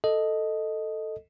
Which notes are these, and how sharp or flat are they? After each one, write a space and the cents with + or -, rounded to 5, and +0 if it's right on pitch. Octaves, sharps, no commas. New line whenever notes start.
A4 +5 D#5 +0